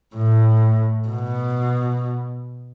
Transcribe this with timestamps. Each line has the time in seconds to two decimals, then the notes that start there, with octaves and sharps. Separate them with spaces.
0.15 A2
1.08 B2